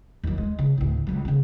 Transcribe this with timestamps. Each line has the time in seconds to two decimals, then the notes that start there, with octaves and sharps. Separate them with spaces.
0.23 D#2 F#3
0.38 G#3
0.59 C#3
0.78 D2 A2
1.07 C#2 F#3
1.25 C#3 C#4